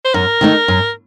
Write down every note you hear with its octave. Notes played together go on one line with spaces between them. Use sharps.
C5
F#2 A#4
D#3 A3 D#4
F#2